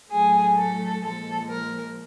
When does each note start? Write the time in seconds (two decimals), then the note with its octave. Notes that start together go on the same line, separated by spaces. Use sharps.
0.11 A2 F#3 A3 G#4
0.58 A4
1.02 A#2 F3 G#3 A4
1.49 A#4